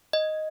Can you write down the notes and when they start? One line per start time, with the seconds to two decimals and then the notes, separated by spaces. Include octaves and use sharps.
0.13 D#5